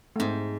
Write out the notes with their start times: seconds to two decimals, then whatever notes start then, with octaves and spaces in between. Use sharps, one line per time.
0.16 A3
0.19 G#2 C4